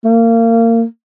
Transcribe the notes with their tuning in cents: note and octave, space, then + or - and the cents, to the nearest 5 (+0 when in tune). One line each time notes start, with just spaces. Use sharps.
A#3 -25